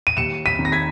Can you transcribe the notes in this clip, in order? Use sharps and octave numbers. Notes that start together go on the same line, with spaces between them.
D#7
D#2 C#7 E7
B6 D#7
D#3
A#6
G#6 B6